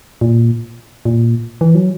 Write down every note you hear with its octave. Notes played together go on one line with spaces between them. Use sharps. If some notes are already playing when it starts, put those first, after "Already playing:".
A#2
A#2
E3
F#3